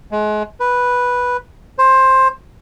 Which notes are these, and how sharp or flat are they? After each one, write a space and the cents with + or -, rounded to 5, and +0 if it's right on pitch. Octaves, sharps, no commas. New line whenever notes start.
G#3 +35
B4 -5
C5 +15